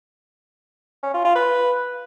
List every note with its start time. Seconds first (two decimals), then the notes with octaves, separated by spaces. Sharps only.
1.03 C#4
1.14 F4
1.25 F4
1.36 B4